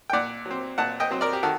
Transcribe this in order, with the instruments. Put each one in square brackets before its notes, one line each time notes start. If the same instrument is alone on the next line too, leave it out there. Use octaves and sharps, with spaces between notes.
[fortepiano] G5
A#2 D5 F#5
F#3 C4
A#2 F#5 A5
D#5 G5
F#3 C4
A#4 D5
G4
D#3 F#4 A4